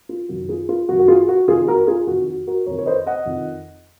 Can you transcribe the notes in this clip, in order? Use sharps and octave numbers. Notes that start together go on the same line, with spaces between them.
F4
F#2 D#3 F#4
F4 G#4
F4 G#4
F#2 D#3 F#4
F#4
F4 G#4
F#4
F2 D#3 F4 G#4
F#4 A#4
F4 G#4
F2 D#3 F#4
F#4
F#4 A#4
F2 D#3 A#4 C#5
C#5
C5 D#5
D#5 F#5
F2 D#3